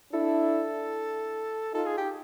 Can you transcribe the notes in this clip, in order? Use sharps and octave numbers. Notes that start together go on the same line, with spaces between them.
D4 E4 A4
D#4 F4 A4
G#4
G4